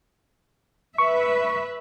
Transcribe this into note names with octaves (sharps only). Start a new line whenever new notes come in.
B4 E5 C#6